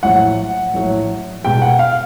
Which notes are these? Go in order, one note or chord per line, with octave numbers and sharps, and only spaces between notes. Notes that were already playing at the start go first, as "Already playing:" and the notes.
A#1 A2 F#3 F#5
A#1 A2 F#3
C2 B2 G#3 G5
F#5
F5